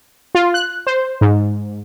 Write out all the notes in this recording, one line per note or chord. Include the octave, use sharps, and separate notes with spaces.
F4
F#6
C5
G#2